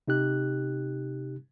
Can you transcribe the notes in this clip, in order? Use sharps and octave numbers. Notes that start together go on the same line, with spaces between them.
C3 D#4 G4 F#6